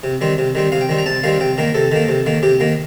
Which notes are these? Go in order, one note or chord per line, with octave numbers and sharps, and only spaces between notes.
C3
D#3 G3 C4
C3
D#3 G3 C4
C3 F5
G5
D#3 G3 C4
A#5
C3 A5
D#3 G3 C4 F5
C3 G5
D#3 A#3 A#4
C3 A4
D#3 A#3
C3
D#3 A#3
C3 G4
D#3 A#3